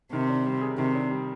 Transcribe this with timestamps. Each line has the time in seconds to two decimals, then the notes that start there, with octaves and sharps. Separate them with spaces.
0.12 C3 D#3
0.29 D4
0.46 G3
0.61 G#4
0.78 C3 D#3
0.95 D4
1.11 G3